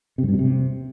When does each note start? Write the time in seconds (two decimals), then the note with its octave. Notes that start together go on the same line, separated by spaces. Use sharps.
0.18 C3
0.23 F#2
0.28 G2
0.34 B2
0.39 C3